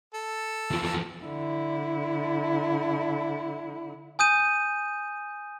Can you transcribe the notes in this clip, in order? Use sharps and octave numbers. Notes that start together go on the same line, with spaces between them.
A4
E2 F3
D3 E4
G#5 D#6 G6 D#7